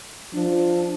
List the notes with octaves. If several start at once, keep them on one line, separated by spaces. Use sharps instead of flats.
F3 D4